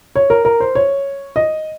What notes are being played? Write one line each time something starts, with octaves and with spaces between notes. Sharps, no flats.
C#5
A#4
A#4
C5
C#5
D#5